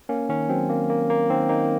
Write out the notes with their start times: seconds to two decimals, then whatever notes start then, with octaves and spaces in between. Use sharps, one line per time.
0.09 A#3 C#4
0.29 D#3 C#4
0.49 F#3 C4
0.70 A#3
0.90 A#3
1.10 A#3
1.30 D#3 C4
1.49 A#3 D#4